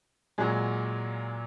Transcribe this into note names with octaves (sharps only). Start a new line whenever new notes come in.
A#2 F#3 G#3